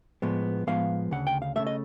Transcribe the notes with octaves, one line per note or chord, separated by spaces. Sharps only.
A2 F3 G#3 B3
A2 F3 G#3 B3 F5
D2 C#3 F#5
G5
F5
C#3 F3 A3 E5
D#5